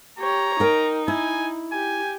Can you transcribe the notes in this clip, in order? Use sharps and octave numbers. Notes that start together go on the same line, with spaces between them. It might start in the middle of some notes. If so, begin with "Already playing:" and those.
G4 C#5 A#5
D#4 A#4 G5
E4 G#5
G4 G#5